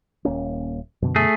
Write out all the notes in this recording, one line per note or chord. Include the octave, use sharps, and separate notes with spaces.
D#1 A#3 C#4
F#2 B2 D3
A3 G#4